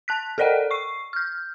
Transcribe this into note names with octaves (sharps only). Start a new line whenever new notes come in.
A5 F#6 B6
A4 A#4 D5 D#5 F#5 G5
C#6 C7
F6 G6